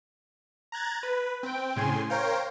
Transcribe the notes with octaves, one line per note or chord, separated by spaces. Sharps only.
A#5 F#6 G#6 A6
B4
C4 G5
A2 C#3 G#5 C6
A#4 C5 C#5 F5 G5